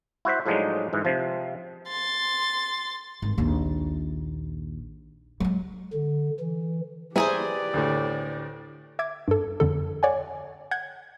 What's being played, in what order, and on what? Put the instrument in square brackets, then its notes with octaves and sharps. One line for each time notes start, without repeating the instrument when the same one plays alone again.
[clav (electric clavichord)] E4 F#4 C5 E5
A2 F3 F#3 G#3 D4 D#4
G#2 E3
C3 F3
[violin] C6 A6
[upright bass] G#1
A#1 D#2
F#3 G#3
[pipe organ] D3
E3
[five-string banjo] E4 G#4 C5 [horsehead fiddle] G4 D5 [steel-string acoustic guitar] B4 G#5 A#5
[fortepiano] D2 A2
[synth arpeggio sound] E5 D6 G#6
G2 A4
F2 D3 A4
C#5 D5 F#5 G#5
F#5 G6 G#6